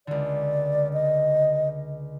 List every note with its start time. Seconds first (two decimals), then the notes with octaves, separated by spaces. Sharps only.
0.07 C#2 D3 D5
0.93 D#5